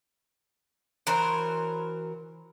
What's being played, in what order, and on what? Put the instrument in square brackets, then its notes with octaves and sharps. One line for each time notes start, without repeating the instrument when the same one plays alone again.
[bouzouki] E3 F#3 A#4 C5